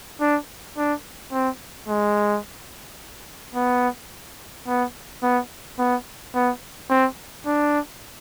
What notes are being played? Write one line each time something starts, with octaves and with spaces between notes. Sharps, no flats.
D4
D4
C4
G#3
B3
B3
B3
B3
B3
C4
D4